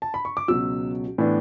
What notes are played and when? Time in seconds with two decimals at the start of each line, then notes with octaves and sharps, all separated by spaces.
0.02 A5
0.14 B5
0.25 C#6
0.37 D6
0.48 C#2 B2 F#3 E6
1.18 A2 E3 B3 D4